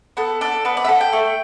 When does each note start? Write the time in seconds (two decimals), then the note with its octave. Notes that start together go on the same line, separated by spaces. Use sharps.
0.17 B3 A4
0.41 D4 A4
0.65 B3 B4
0.77 D5
0.84 E5
0.88 A4 F#5
1.01 G5
1.13 A3